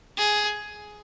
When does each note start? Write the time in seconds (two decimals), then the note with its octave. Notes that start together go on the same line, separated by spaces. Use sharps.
0.17 G#4